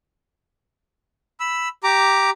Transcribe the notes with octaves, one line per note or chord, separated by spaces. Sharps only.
B5 E6
G4 A#5 D6